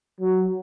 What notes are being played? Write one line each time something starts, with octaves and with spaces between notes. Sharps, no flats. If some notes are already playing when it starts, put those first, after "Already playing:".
F#3